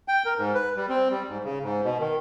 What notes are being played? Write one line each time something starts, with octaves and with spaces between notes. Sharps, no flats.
G5
A#4
G#2
B4
G3
C4
G3
G#2
C#3
G#2
B2
D#3